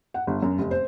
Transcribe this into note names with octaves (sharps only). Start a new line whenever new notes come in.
F#5
G1
F#2
F1
C5